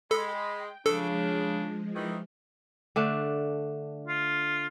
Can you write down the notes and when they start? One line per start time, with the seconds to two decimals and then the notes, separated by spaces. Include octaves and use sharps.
0.11 G#3 A4 G5 B5
0.86 C#3 F3 G#3 D4 A4
1.94 D#3 E3
2.96 D3 A3 D4
4.07 F4